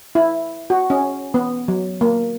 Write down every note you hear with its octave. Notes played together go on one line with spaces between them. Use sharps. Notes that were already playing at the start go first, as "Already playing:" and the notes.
E4
F#4
C#4
B3
F#3
A#3